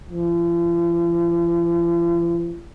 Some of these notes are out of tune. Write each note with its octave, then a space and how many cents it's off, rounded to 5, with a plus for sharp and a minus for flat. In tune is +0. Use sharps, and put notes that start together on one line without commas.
F3 -45